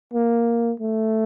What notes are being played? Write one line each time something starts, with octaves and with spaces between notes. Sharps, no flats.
A#3
A3